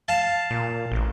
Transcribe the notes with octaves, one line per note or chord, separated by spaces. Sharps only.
F5 A5
A#2
A1